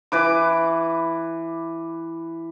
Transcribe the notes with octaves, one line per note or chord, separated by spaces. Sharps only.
E3 B4 D6